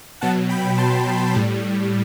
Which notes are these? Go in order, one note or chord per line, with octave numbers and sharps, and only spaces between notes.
B2 F#3 F#5 A5
G5 B5
A5 C6
A2 G3